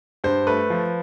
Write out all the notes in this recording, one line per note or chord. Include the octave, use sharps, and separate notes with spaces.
G2 C5
A3 B4
F3